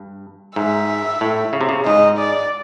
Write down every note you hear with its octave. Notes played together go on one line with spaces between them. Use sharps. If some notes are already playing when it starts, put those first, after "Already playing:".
Already playing: G2
G#2 E5
A2
C#3
C3
C#3
G#2 D#5
D5